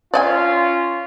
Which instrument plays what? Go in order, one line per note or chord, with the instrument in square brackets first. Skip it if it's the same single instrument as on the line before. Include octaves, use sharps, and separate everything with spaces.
[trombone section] C#4 F4 [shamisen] D5 D#5 G#5